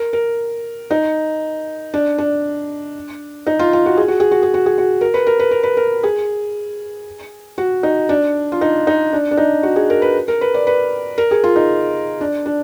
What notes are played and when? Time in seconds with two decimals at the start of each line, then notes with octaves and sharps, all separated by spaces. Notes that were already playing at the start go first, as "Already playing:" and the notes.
Already playing: A#4
0.13 A#4
0.91 D#4
1.94 D4
2.18 D4
3.47 D#4
3.59 F4
3.73 F4
3.86 F#4
3.97 G#4
4.08 F#4
4.20 G#4
4.31 F#4
4.43 G#4
4.54 F#4
4.66 G#4
4.78 F#4
5.01 A#4
5.14 B4
5.27 A#4
5.39 B4
5.51 A#4
5.63 B4
5.77 A#4
6.03 G#4
7.58 F#4
7.83 D#4
8.09 D4
8.52 F4
8.61 D#4
8.87 D#4
9.13 D4
9.31 D4
9.37 D#4
9.63 F#4
9.76 G#4
9.90 A#4
10.02 B4
10.28 A#4
10.41 B4
10.54 D5
10.67 B4
11.18 A#4
11.31 G#4
11.44 F4
11.56 D#4
12.21 D4
12.46 D4